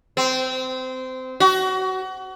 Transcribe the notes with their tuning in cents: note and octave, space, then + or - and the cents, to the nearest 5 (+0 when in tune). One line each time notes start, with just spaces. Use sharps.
C4 -20
F#4 +25